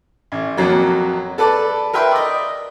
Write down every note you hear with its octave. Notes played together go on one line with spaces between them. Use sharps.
A1
F2 F#3 A#3
A4 B4 D5 A5
A#4 B4 E5 G5 C6
D5 D#5